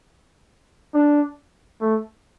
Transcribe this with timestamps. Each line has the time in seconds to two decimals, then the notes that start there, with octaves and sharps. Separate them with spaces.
0.94 D4
1.81 A3